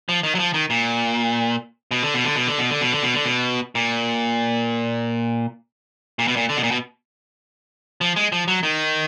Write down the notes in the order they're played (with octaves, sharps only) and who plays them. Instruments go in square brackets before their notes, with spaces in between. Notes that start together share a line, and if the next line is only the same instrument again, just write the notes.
[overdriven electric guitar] F3
D#3
F#3
F3
D#3
A#2
B2
D3
B2
D3
B2
D3
B2
D3
B2
D3
B2
D3
B2
A#2
A#2
B2
A#2
D3
B2
A#2
B2
F3
G#3
F3
F#3
D#3